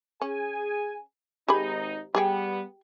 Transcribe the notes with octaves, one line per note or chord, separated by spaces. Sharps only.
C#4 G#4 G#5
G#1 D#4 G4 G#4 B5
G3 B3 G4 G#4 G5